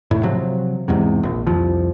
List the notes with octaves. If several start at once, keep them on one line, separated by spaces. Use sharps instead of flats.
A2
C3 F3 F#3
E2 G#2 C3
A#1
C2 F2 F3